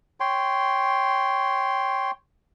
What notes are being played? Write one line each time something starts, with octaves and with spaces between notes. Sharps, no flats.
C#5 G5 C6